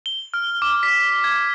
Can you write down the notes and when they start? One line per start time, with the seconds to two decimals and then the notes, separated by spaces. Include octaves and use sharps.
0.06 G7
0.34 F6
0.62 D6
0.83 B6
1.24 G#6